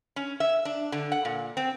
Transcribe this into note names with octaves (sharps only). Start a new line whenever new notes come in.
C#4
E5
D4
D3
F#5
A#2
C4